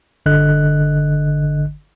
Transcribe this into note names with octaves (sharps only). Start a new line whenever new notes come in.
G1 D3 D#5 F#6